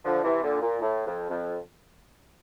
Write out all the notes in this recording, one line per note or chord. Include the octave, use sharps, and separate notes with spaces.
D3 F3
C3 E3
A#2 D3
A#2
A2
F2
F2